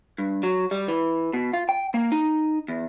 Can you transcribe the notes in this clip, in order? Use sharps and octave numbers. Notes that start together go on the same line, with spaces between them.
G2
F#3
G3
E3
B2
F4
G5
A#3
D#4
E2